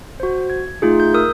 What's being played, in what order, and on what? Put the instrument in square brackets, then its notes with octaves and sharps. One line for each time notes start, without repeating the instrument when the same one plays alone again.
[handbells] F#4 C5
G#6
A3 D#4 F4 G#4
G6
A#4 D#6 E6